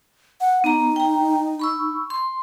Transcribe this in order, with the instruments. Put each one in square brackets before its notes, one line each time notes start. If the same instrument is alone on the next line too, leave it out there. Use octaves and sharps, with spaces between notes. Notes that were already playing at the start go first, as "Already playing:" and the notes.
[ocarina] F#5
[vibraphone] B3 A#5 [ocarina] D#4
[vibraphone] G5 A#5
B5 C#6 E6
C6